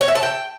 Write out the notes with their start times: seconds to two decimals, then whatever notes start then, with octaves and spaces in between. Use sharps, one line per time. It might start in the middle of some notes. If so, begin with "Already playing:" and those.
0.01 C#5
0.08 E5
0.15 A5
0.23 G5